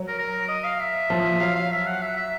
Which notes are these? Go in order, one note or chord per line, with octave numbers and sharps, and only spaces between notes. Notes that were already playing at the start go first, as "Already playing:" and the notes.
Already playing: F#3
A#4
A#4
D#5
F5
E5
F3
F#3 F5
F5
E5
F#5
E5
E5